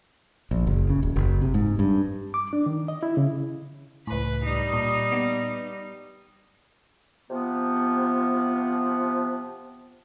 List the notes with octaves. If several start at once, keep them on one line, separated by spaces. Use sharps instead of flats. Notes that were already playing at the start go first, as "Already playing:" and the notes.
A#1
F#1
C#3
D#1
F#1
C3
G#2
G2
D6
D4
D#3
D#5
E4
C#3
C#2 A2 B4
G3 D#4
A#2
B3
C3 F3 B3